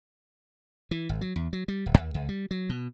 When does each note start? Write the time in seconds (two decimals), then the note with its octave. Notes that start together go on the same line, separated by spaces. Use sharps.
0.91 E3
1.09 G#1
1.21 F#3
1.36 E2
1.53 F#3
1.68 G3
1.86 D1
1.97 D#2
2.14 C#2
2.29 G3
2.51 F#3
2.69 B2